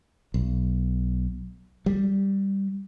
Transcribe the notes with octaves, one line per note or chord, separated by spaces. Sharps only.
B1
G3